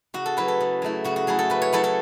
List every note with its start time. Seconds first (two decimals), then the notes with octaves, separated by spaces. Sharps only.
0.14 C#3 F#4
0.26 A4
0.37 F#3 A3 E4 B4
0.48 A4
0.60 C#3
0.82 F#3 A3 E4
1.04 C#3 F#4
1.16 F#4
1.27 F#3 A3 E4 G#4
1.39 A4
1.50 C#3 B4
1.62 C#5
1.73 F#3 A3 E4 A4
1.84 A4